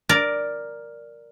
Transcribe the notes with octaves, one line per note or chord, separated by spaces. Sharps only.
A#4 D5